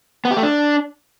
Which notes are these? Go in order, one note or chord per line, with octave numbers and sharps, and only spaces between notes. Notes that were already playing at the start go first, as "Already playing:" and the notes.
B3
G4
A3
D4